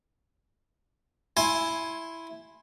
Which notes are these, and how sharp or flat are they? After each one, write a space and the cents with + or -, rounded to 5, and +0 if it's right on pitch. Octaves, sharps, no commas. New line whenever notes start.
E4 +0 G#5 +0 C6 +15